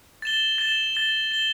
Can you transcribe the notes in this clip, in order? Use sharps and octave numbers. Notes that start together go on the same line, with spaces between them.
A6 E7 G7
A6 E7 G7
A6 E7 G7
A6 E7 G7